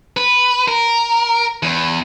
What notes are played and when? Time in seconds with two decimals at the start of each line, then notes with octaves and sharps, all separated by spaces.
0.17 B4
0.68 A#4
1.63 E2